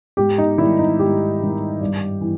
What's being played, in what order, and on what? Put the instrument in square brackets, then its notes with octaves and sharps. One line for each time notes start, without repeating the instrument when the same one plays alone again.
[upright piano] G#2 G4
D#4
D#3 G3 E4
D#4
G#2 G4
D#3 G3
G2
E3